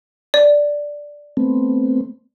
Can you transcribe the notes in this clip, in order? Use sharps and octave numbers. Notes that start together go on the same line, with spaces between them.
D5
A3 B3 C4